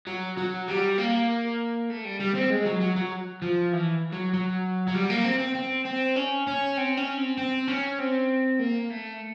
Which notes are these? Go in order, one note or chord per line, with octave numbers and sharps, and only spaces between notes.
F#3
F#3
G3
A#3
A3
G3
G3
C4
G#3
F#3
F#3
F#3
F3
E3
F#3
F#3
F#3
G3
A#3
C4
C4
C4
C4
C#4
C#4
C4
C#4
C4
C4
C#4
C4
A#3
A3